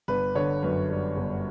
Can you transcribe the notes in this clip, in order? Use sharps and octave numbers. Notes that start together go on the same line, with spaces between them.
G1 B4
D3 C#5
F#2 B4
G3
G1